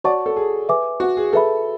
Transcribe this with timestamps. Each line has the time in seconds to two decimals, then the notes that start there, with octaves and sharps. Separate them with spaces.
0.04 F#4 C#5 D5 F#5 A5 C#6
0.26 A4
0.36 G#4
0.69 B4 E5 G#5 D6
1.00 F#4
1.17 G#4
1.33 G#4 A4 B4 E5 B5